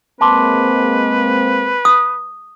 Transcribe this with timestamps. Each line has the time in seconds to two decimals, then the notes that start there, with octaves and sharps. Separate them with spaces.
0.21 G#3 A#3 C4 B4 A5 C6 D6
1.85 D#6